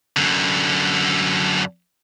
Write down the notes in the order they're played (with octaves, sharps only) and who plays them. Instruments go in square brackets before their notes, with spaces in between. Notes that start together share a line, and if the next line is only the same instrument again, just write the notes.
[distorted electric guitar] F#2 D3